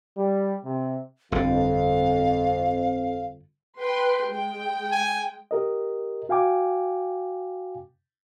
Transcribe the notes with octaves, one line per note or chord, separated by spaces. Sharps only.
G3
C3
G1 F2 D3 F5
B4 G5 C6
G#3 G5
G#5
G4 A#4 D#5
F#4 F5 G5 G#5 D6